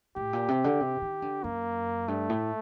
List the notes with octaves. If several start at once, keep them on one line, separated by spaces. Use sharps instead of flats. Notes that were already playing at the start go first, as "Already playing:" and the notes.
A2 G4
A#2
C3
D3
C3
D#3
D3
F#2 A#3
G2 A3
A2